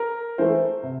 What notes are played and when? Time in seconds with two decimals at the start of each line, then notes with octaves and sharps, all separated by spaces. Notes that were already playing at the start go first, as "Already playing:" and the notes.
Already playing: A#4
0.38 E3 A3 C5
0.83 C3